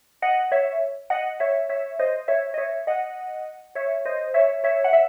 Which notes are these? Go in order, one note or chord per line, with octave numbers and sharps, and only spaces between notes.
D#5 F#5
C#5 E5
D#5 F#5
C#5 E5
C#5 E5
C5 D#5
C#5 E5
D#5
C#5 E5
D#5 F#5
C#5 E5
C5 D#5
C#5 E5
C#5 E5
F#5
E5